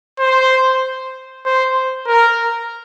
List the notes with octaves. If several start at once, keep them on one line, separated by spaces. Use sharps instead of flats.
C5
C5
A#4